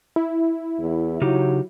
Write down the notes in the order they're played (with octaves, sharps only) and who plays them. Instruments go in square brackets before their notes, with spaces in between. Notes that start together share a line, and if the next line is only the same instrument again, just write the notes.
[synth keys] E4
[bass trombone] E2
[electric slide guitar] C#3 D#4 G4 [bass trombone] F#3